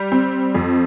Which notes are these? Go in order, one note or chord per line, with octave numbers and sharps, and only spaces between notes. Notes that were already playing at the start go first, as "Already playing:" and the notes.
Already playing: G3
C4
F2